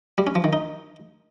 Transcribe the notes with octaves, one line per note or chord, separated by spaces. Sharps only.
G3
C#4
F3
D#3
D#4